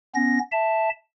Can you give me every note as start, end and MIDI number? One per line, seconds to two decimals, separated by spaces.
0.15 0.39 59
0.15 0.39 61
0.15 0.39 94
0.52 0.90 76
0.52 0.90 81